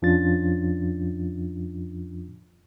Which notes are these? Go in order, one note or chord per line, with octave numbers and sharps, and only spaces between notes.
F2 F3 C#4 D4 F4 A6